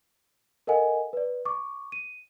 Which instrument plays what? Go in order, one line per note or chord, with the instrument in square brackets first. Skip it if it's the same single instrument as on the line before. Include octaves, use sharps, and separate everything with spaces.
[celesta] A4 A#4 D#5 F#5 G#5
B4 D5
C#6 D6
D#7